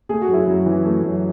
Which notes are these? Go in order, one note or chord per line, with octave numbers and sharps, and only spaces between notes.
A3 G#4
F#4
F#2
E4 G#4
F#2
E3
A3
F#2